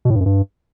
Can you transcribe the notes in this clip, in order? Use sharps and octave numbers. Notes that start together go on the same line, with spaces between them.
B2
A2
G2
F#2
G2